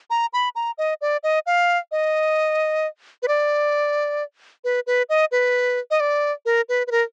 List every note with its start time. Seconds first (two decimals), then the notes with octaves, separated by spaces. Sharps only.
0.10 A#5
0.33 B5
0.55 A#5
0.78 D#5
1.01 D5
1.23 D#5
1.46 F5
1.92 D#5
3.23 B4
3.28 D5
4.64 B4
4.87 B4
5.09 D#5
5.32 B4
5.91 D#5
6.00 D5
6.46 A#4
6.69 B4
6.87 B4
6.91 A#4